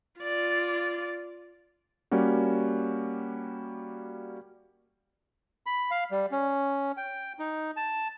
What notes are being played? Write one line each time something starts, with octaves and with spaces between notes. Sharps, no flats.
F4 D5
G3 A#3 C#4 F#4
B5
F5
G3
C#4
G5
D#4
A5